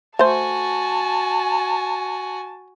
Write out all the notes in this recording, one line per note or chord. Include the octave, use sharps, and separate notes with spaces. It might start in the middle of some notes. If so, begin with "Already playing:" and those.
A3 F#4 C5 G#5 A5